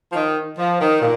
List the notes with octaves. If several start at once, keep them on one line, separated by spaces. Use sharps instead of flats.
F3
D#3
F3
D#3
A#2